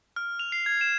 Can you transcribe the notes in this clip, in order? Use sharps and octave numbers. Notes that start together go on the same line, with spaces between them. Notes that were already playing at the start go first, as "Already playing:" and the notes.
F6
F7
C7
G#6
E7